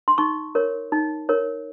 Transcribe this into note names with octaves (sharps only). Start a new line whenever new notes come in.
C6
D#4 C#6
A#4 C#5
D#4
A#4 C#5